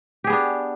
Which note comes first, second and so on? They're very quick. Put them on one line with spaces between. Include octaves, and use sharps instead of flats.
G4 G#4 B3 D4